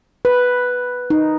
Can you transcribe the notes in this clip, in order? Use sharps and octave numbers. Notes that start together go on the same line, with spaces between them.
B4
D#4